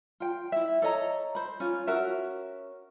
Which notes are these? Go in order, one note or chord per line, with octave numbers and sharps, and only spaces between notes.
F4 G5
E4 E5
A4 C#5 D#5 A#5
C5 B5
C#4 F4
C#4 F#4 A#4 E5